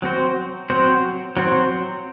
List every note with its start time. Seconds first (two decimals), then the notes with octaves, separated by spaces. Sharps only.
0.02 F#3 C4 F#4 C5
0.70 F#3 C4 F#4 C5
1.37 F#3 C4 F#4 C5